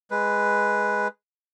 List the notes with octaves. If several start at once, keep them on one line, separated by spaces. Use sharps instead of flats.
G#3 B4